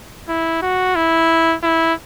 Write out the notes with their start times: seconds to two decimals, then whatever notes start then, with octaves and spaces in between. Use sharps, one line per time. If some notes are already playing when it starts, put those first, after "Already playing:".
0.29 E4
0.62 F#4
0.96 E4
1.63 E4